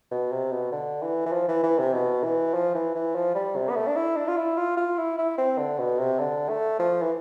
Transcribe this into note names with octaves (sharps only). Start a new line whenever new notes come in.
B2
C3
B2
D3
E3
E3
F3
E3
E3
C3
B2
E3
F3
E3
E3
F3
G3
C3
B3
A3
D4
E4
D4
F4
E4
F4
F4
E4
E4
C4
D3
B2
C3
D3
A3
F3
E3